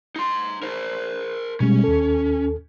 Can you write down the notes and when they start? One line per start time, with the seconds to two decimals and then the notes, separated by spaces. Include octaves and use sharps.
0.16 D#4 C6
0.63 A#4 C5
1.60 B2 G3 G#3 C#4
1.84 D#2 A4